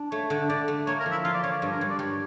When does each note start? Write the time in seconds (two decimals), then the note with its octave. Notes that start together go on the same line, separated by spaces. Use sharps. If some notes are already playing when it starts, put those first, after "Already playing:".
Already playing: D4
0.12 A3 C#5
0.30 D3
0.49 D3 D5
0.68 A3
0.87 A#3 C#5
1.00 A#4
1.06 F3
1.12 E4
1.24 F3 F4
1.34 D5
1.44 F3 C#5
1.52 D5
1.62 G2 C#5
1.72 A#4
1.81 G2 C#5
1.90 D5
1.99 G3 C#5